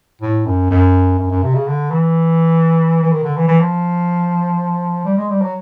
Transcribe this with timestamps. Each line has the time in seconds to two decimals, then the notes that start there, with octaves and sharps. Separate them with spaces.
0.22 A2
0.46 F#2
0.71 F#2
1.19 F#2
1.31 F#2
1.43 C3
1.55 C#3
1.68 D3
1.91 E3
3.03 E3
3.12 D#3
3.24 D3
3.37 E3
3.48 E3
3.60 F3
5.05 G3
5.17 G#3
5.30 G3
5.42 F#3